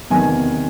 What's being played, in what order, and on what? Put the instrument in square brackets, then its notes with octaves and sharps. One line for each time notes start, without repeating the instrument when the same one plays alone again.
[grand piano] E2 C3 D#3 G#5